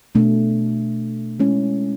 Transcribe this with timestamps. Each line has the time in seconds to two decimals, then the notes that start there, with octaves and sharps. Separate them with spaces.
0.15 B2 A3 D4
1.39 G#3 C#4 E4